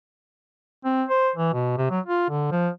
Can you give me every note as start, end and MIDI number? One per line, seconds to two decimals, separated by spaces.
0.84 1.04 60
1.09 1.30 72
1.36 1.53 52
1.53 1.77 47
1.78 1.86 48
1.91 2.00 54
2.06 2.28 65
2.29 2.51 50
2.52 2.69 53